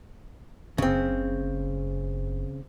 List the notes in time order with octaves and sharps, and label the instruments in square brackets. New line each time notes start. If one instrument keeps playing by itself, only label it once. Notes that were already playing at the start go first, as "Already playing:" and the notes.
[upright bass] F#1 [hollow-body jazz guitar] C#3 C4